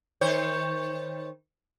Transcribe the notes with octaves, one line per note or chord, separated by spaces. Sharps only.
D#3 C5 C#5